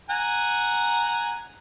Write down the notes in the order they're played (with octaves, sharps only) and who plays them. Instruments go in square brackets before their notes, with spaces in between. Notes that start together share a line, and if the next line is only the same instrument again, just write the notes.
[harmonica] F#5 G#5 A#5